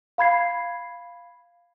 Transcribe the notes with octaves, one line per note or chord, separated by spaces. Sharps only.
F5 B5 G#6 C7